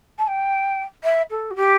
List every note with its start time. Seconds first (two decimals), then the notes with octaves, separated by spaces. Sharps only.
0.19 A5
0.28 G5
1.04 E5
1.30 A4
1.51 F#4
1.56 G4